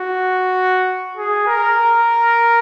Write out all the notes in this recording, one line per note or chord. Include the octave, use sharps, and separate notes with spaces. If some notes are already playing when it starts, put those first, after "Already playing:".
Already playing: F#4
G#4
A#4